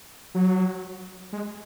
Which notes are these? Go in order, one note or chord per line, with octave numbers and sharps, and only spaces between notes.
F#3
G#3